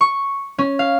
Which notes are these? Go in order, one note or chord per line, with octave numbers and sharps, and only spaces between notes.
C#6
C#4
F5